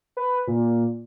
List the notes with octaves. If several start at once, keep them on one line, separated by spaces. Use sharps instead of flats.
B4
A#2